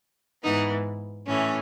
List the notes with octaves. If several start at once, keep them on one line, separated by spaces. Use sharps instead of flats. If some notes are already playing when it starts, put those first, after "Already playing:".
G#2 E3 B3 D#4
A2 E3 A3 C#4